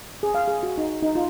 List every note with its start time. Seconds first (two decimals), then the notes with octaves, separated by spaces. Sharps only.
0.23 G#4
0.35 F5
0.48 G#4
0.63 F#4
0.78 D#4
1.03 D#4
1.15 F4